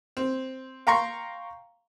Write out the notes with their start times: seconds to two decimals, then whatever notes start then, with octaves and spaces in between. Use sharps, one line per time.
0.17 C4
0.87 F5 G5 A#5 C6 C#6